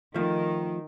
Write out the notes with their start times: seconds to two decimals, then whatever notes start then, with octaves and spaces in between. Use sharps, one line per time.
0.14 D#3 F3 A3